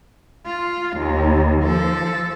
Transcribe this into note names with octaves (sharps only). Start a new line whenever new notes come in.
F4
D#2
F3 A4